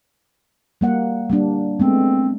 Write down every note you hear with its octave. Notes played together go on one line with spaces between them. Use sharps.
G3 A#3 F#5
G3 A#3 D4
G#3 A3 B3 C4